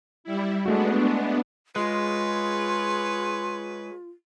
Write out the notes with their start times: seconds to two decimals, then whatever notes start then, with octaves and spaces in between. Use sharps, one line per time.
0.24 G3 E4
0.66 G#3 A3 B3 D4 F#4
1.76 G#3 F4 G#4 B4 C#5 C6